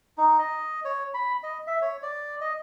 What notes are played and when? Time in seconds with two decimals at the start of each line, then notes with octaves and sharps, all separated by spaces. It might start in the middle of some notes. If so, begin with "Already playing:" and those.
0.18 D#4
0.39 D#5
0.85 C#5
1.14 B5
1.43 D#5
1.67 E5
1.82 C#5
2.03 D5
2.41 D#5